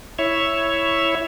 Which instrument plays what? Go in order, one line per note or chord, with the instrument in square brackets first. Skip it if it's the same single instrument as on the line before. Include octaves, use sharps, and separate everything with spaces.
[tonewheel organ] E4 C#5 E5